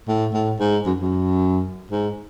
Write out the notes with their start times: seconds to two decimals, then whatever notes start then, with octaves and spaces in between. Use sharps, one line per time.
0.08 A2
0.34 A2
0.60 G#2
0.86 F#2
1.01 F#2
1.90 G#2